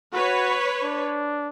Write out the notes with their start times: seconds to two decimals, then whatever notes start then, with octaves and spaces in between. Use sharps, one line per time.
0.13 F#4 B4 C#5
0.83 D4